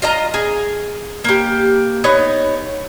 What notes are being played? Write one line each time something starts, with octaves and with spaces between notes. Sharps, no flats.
F4 D#5 A#5
G#4
A#3 G4
B3 D#4 C#5